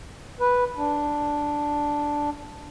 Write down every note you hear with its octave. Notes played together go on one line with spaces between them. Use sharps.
B4
D4